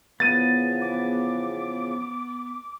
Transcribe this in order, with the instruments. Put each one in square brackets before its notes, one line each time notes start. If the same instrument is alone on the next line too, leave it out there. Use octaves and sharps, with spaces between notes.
[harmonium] E2 C#3 F3 [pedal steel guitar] B3 [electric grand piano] A6 D#7
[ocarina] D6